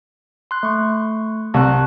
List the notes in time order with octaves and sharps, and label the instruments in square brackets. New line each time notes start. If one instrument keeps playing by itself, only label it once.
[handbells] C6 F#6
A3 C#6
[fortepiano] C2 [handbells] A5 C#6 F#6